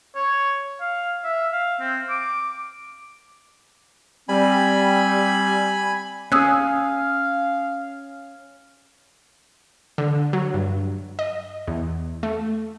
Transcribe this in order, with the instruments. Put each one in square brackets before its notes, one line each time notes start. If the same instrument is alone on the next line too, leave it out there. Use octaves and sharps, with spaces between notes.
[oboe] C#5
F5
E5
F5
C4
D6
[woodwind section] G3 C4 [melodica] G#5 B5
[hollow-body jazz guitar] C#4 G#4 [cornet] F5 [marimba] D#6 E6 F#6
[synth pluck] D3
F#3
G2
D#5
E2
A3